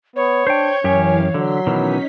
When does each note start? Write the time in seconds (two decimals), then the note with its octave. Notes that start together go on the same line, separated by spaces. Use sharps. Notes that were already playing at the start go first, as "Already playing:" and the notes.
0.16 B3 C#5
0.47 D4 C5 G5 C#6 G6 G#6
0.84 F#2 E3 C#4 G4 F5
1.34 D3 F#3 C6 B6
1.67 B2 D#3 E3 C#4 D#4 B6